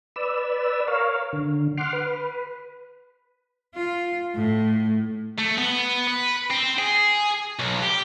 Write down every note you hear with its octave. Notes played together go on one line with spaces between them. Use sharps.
B4 D5 E6
A#4 C#5 F5
D3
F#5 C6 D6 F6
B4
F4
A2
A3
B3
B4
C4
G#4
B1
G4